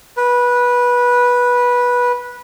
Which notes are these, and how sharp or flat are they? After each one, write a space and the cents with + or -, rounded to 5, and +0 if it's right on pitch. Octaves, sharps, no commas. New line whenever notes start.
B4 -15